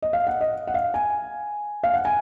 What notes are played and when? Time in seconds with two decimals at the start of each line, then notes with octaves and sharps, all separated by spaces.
0.02 D#5
0.13 F5
0.27 F#5
0.41 D#5
0.67 F#5
0.74 F5
0.94 G#5
1.83 F5
1.94 F#5
2.05 G#5